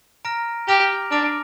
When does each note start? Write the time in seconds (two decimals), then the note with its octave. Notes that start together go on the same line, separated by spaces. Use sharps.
0.25 A#5 F6 A#6 D7
0.68 G4 D6 F6 A#6 D7 F7
1.11 D4 D6 F6 A#6 D7 F7